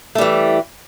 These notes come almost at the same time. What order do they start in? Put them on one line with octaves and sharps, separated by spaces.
A3 G3 E3